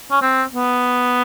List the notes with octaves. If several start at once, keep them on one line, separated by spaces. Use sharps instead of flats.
C#4
C4
B3